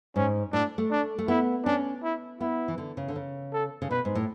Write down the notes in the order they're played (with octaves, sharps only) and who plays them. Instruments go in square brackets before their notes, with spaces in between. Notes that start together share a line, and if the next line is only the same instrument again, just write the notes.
[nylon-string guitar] G#2 [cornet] C#4
[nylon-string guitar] A2 [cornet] D4
[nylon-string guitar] A3
[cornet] D4
[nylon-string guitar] A3
[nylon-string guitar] B3 [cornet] E4
[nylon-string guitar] C#4 [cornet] D4
[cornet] E4
[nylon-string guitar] B3 [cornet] E4
[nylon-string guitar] E3
D3
C#3
D3
C#3
[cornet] A4
[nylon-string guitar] C#3
[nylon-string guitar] B2 [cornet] B4
[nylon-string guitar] G#2
A2